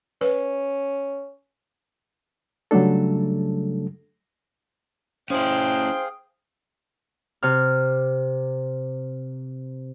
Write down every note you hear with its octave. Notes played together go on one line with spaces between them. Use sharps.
C#4 B4
C#3 F#3 G3 A3 D4 A4
C#4 E4 G#4 C5 F5 G5
C3 F6